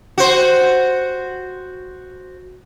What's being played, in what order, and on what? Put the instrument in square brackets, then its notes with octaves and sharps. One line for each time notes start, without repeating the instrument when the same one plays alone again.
[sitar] F#4 C5